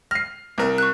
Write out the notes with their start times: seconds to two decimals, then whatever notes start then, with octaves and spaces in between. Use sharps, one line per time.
0.11 F6 A#6 C7
0.58 C2 A#4
0.78 C#6 F#6